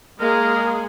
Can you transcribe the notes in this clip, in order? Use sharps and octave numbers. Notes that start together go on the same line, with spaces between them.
G#3 A#3 G#4 A#4